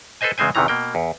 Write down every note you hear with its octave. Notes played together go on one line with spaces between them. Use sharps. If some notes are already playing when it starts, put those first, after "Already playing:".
A4 B4 C5 D#5 G#5
E2 C#3 G#3 C4 C5 G#5
E2 C3 D#3 E3 A#5
B2 A#3 G5
E2